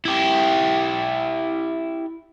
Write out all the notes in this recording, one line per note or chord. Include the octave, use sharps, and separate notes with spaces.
E4 G4